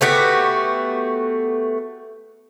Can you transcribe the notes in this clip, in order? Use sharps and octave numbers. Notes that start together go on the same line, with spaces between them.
A3 B3 F#4 G4